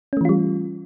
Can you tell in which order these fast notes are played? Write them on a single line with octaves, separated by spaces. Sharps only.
C#4 A3 E3 F4 G3